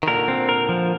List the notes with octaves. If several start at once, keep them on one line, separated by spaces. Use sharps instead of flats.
D#3
A#2 D3 A#4
C4
A#4
F3